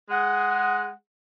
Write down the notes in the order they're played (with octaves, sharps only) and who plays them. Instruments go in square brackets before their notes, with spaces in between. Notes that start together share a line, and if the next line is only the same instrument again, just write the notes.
[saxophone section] G#3 G#4 F#5